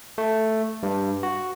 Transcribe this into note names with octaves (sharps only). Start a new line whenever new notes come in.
A3
G2
F#4